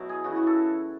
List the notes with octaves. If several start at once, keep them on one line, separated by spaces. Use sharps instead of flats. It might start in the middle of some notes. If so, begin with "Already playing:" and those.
Already playing: B2 F#3 E4
G#4
C#3 E3 F#4
F#4
A4